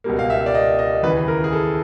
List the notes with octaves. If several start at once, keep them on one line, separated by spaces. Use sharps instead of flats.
C#2 B2 G3 A#3
F5
E5
D5
D#5
D#5
D#2 C#3 E3 B4
A#4
G#4
A4